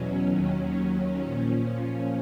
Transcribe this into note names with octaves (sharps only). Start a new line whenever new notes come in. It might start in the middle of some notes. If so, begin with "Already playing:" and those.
Already playing: E2 B2 F#3 C#4
D#2 D#3 F#3 C#4
A#2 F3